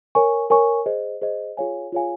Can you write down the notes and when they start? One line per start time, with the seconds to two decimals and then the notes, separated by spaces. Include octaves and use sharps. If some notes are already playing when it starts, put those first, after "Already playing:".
0.15 A#4 C#5 G#5 C#6
0.50 A#4 C#5 G#5 C#6
0.86 G#4 C5 D#5
1.22 G#4 C5 D#5
1.57 F4 G#4 C#5 F5 G#5
1.92 F4 G#4 C#5 F5 G#5